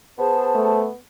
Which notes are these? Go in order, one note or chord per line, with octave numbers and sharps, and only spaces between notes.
B3 G#4 C5 A5
A3